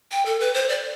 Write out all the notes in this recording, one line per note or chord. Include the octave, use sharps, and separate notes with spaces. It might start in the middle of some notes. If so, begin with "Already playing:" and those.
G5
A4
B4
C5
D5